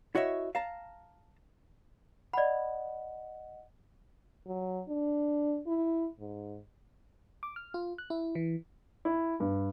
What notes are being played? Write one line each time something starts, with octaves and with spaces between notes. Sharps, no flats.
E4 F#4 C#5 D#5 E5
F5 A5 A#5
D5 D#5 F#5 B5
F#3
D4
E4
G#2
D6
F6
F4
F#6
E4
E3
E4
G2